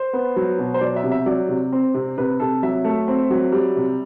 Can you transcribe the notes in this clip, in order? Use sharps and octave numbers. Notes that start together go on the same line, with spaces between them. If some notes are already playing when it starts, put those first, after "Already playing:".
Already playing: C5
B3
F#3
B2
C5
F#3 D5
E5
C3
E5
F#3 D5
C3
C4
C3
C3 B4
C3 A4
F#3 E5
A3
C4
F#3
G3
C3